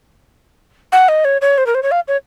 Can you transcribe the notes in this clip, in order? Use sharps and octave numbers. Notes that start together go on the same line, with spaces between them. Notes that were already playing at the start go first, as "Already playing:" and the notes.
F#5
D#5
C#5
C#5
C5
A#4
C5
C#5
F5
C#5